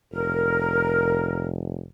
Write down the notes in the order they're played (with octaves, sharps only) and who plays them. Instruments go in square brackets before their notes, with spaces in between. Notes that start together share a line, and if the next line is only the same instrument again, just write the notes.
[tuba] F1 [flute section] A#4